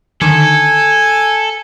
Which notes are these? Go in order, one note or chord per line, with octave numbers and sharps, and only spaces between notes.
D3 D#3 A4 G#5